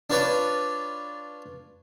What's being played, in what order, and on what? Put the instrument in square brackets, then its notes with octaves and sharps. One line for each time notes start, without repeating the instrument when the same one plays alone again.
[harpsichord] D4 F4 B4 C#5 D5 B5